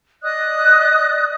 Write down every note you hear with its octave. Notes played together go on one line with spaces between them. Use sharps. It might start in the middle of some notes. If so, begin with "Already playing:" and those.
D5 D#5 D#6 F#6